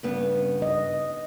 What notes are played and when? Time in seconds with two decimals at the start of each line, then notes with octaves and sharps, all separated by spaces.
0.03 G2 C#3 B3
0.62 D#5